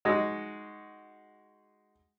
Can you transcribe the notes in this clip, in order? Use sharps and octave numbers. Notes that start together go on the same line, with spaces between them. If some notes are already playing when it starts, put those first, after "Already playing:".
G#3 D#4 F#4